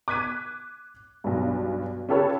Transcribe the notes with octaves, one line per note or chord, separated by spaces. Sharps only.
D6 F#6 G#6 B6 D#7
B1 G2
C#4 F4 G4 A4 B4 C#5